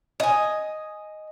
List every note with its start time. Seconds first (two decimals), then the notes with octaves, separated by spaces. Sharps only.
0.20 D#5 G#5